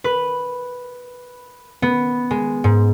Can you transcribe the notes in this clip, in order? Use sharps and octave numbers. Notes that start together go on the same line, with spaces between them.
B4
B3
G#3
G#2